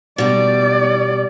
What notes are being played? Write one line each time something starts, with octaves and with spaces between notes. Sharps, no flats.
B2 G3 D5